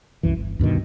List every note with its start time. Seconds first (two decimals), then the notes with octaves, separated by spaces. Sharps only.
0.23 C2 F#2 E3
0.37 G1
0.59 D2 G2 B2 D#3